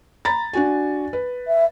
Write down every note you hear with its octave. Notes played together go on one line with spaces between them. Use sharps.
A#5 B5 A6
D4 F#4 G#5
B4
E5